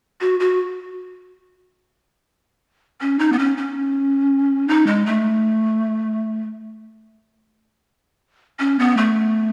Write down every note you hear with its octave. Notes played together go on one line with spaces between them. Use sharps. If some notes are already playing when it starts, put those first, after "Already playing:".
F#4
F#4
C#4
D#4
B3
C#4
C#4
D#4
G#3
A3
C#4
B3
A3